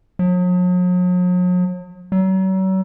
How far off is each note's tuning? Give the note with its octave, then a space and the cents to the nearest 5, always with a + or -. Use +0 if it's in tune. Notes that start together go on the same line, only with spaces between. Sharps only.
F#3 -45
F#3 +40